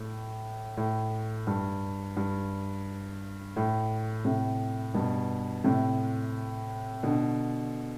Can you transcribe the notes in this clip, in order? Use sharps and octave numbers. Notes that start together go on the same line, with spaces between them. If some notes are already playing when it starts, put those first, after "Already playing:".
Already playing: A2
A2
G2
G2
A2
A2 C3
G2 B2
A2 C3
B2 D3